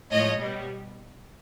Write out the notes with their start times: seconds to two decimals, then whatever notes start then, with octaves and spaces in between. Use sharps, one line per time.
0.11 A2 F3 G#3 C#5 D#5
0.39 B2 G3 B3